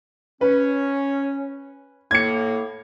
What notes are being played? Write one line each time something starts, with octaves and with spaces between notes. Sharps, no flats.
C#4 B4
A2 A#3 G#6 C#7